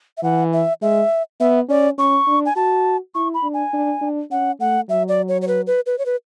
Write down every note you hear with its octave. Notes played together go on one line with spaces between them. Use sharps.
E5
E3 F#5
E5
G#3 E5
B3 E5
C#4 D5
C#4 C#6
D4
G#5
F#4 A5
E4 C#6
B5
D4
G#5
D4
D4
C#4 F#5
A3 F#5
F#3 E5
D5
C#5
C#5
B4
B4
B4
C#5
B4